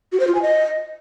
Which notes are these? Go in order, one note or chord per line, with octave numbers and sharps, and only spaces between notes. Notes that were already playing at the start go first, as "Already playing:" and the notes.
F#4
C5
F4
G#5
D#5